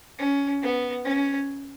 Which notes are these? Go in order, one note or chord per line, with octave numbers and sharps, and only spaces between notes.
C#4
B3
C#4